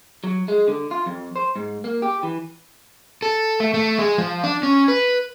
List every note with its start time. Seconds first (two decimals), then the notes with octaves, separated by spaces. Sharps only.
0.24 F#3
0.48 G#3
0.68 D3
0.91 F4
1.06 F2
1.36 C5
1.56 G#2
1.84 A#3
2.02 G4
2.23 E3
3.22 A4
3.60 A3
3.74 A3
3.99 G#3
4.18 F3
4.43 D4
4.63 C#4
4.88 B4